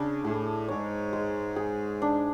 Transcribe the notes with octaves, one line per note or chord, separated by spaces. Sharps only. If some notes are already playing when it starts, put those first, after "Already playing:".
Already playing: C#3 D4
A2 G#4
G#2 C#5
G#3
G#4
D4